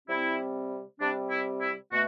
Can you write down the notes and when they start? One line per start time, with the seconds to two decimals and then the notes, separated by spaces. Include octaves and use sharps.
0.08 C3 G3 C4 E4
1.00 C3 G3 C4 D4
1.31 E4
1.62 E4
1.92 B2 A3 F#4